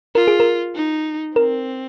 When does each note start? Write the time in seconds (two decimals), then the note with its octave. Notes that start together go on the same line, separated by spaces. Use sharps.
0.15 F4 A#4
0.28 G#4
0.40 A#4
0.75 D#4
1.36 C4 A#4